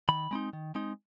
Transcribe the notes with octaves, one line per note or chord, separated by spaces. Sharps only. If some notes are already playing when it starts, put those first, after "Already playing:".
D#3 B5
G#3 C4 D#4
D#3
G#3 C4 D#4